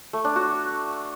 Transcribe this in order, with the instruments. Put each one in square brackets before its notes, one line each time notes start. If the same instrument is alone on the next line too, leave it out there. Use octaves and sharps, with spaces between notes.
[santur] A3
D4
F#4